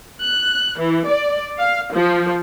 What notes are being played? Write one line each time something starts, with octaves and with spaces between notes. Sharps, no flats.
F#6
E3
D5
F5
F3